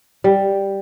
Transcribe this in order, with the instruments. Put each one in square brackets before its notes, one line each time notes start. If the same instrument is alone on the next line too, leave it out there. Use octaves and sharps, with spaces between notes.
[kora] G3